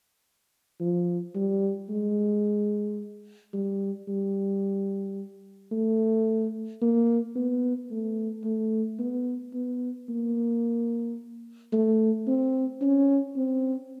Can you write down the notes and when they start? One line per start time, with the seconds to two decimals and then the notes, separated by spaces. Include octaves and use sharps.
0.80 F3
1.35 G3
1.90 G#3
3.53 G3
4.08 G3
5.71 A3
6.82 A#3
7.36 B3
7.91 A3
8.44 A3
8.99 B3
9.54 B3
10.09 A#3
11.73 A3
12.27 C4
12.82 C#4
13.36 C4